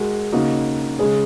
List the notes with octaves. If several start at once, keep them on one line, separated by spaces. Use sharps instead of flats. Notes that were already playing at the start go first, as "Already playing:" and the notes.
Already playing: G#3 F#4 A#4
C#3 A#3 D#4 F#4 D#5
C#3 G#3 C#4 G#4